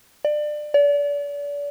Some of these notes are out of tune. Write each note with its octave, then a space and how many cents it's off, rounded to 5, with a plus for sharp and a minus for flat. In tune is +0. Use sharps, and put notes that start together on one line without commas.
D5 +25
D5 -35